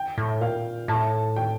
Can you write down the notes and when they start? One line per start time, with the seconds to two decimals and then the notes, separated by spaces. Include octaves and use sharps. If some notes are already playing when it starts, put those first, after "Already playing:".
Already playing: G5
0.18 A2
0.41 A#2 F5
0.88 A2 A5
1.36 G5